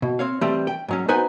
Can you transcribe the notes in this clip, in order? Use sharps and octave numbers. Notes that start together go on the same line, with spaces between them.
B2
C4 C#5 F5
E3 G3 A3 C4 G4
G5
G#2 F#3 C#4
B3 D#4 F#4 B4 C5 G#5